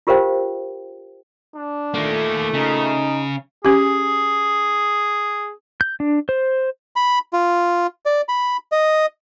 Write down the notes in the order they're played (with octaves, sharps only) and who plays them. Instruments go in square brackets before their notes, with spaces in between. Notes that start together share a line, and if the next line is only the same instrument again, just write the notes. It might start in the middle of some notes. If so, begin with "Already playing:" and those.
[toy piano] F4 G4 A#4 C5 F5 G5
[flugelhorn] D4
[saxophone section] A#2 A3 [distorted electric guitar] D#3 A#3
[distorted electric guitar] C#3 [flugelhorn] D#4
[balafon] C#4 G4 [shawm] G#4
[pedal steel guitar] G6
D4
C5
[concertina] B5
F4
D5
B5
D#5